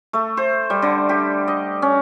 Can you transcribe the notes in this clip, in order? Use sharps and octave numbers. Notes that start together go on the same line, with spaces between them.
A3
C5
G3
D3
G4
D#5
C#4